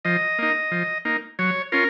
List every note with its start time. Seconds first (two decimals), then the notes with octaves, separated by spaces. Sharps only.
0.05 F3 D#5
0.39 A#3 D#4
0.71 F3
1.05 A#3 D#4
1.39 F#3 C#5
1.72 C#4 F4 A#4